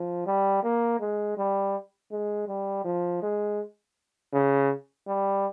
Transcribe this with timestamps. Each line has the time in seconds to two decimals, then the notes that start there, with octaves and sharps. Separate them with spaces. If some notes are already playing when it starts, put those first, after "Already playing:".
Already playing: F3
0.26 G3
0.63 A#3
1.00 G#3
1.37 G3
2.12 G#3
2.48 G3
2.85 F3
3.22 G#3
4.33 C#3
5.08 G3